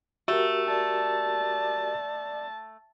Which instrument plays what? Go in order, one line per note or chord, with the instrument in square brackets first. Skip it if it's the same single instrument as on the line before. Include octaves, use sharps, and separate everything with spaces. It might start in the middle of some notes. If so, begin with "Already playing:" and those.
[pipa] A3 [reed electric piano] F#4 G4 A#4
[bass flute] D5 [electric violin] A5